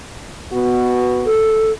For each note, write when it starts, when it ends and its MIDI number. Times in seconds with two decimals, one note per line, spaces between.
0.52 1.31 47
0.52 1.31 59
0.52 1.31 66
1.26 1.72 69